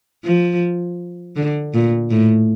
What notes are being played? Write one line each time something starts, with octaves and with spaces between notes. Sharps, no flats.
F3
D3
A#2
A2